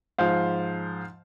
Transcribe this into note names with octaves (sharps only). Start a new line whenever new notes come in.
G#2 F3 C5 F5